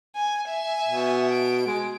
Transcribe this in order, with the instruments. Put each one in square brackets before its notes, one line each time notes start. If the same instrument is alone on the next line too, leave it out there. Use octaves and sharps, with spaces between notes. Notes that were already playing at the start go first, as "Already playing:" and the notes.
[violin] G#5
E5 G#5
[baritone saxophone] B2
[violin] D7
[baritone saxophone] G#3